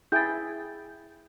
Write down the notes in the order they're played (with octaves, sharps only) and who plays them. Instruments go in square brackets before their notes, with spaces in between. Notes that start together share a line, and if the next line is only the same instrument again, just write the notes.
[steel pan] E4 G#4 G5 [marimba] G6 A6